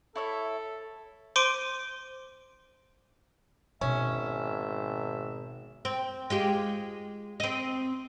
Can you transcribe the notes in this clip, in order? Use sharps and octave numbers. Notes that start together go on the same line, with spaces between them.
E4 A4 C#5 E5
C5 C6 D6 D7 D#7
G#1 B2 C#4 E5
C4
G#3 F4 G4
C4 D#5